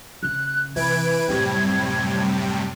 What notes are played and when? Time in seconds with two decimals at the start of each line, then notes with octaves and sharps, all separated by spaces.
0.23 C#3 F#6
0.76 C3 E3 B4 G#6 D7
1.28 F#2 A2 C3 G3